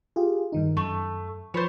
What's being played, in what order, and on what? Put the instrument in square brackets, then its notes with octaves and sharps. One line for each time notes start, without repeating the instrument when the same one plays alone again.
[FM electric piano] F4 G4 G#4
G2 D#3 D#4
[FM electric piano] F#2 [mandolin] A3
[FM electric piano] F3 B5 A6 [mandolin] C5 C#5